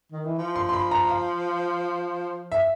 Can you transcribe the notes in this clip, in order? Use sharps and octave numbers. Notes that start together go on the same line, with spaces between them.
D#3
E3
F3
C6
C6
B5
A#5
F5
E5